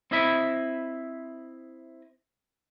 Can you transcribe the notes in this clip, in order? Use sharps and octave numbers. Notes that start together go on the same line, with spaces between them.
C4 E4 D#5 E5 B5